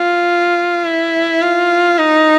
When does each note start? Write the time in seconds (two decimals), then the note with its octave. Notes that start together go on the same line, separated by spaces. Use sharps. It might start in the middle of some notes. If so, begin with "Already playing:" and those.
Already playing: F4
0.84 E4
1.41 F4
1.98 D#4